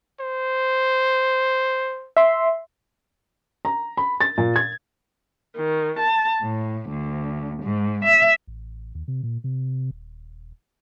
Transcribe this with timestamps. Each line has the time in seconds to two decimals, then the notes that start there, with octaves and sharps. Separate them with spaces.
0.20 C5
2.17 E5 C6
3.65 A#5
3.97 B5
4.21 A6
4.37 A#2
4.56 G#6
5.56 D#3
5.98 A5
6.41 A2
6.88 D2
7.62 G#2
8.04 E5
8.47 A1
8.95 D#2
9.08 C3
9.23 A#2
9.44 C3
9.91 D#1